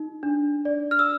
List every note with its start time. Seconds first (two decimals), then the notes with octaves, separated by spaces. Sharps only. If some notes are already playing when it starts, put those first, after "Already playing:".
Already playing: D#4
0.23 D4
0.65 D5
0.91 F6
0.99 E6